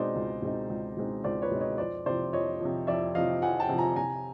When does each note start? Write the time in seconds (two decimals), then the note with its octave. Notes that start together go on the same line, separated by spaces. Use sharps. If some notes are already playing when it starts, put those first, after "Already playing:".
Already playing: B2 G#3 C4 D#4 C5 D5 D#5
0.15 C#2
0.42 B2 G#3 C4 D#4
0.69 C#2
0.97 B2 G#3 C4 D#4
1.24 C#2 C5 D5
1.42 B4 C#5
1.51 B2 G#3 C4 D#4
1.61 C#5 D#5
1.78 F2 C5 D5
2.06 C3 F3 C5 D5
2.33 F2 C#5 D#5
2.60 C3 F3
2.87 F2 D5 E5
3.15 C3 F3 D#5 F5
3.42 F2 F#5 G#5
3.60 G5 A5
3.69 C3 F3
3.78 G#5 A#5
3.96 C3 G#5 A#5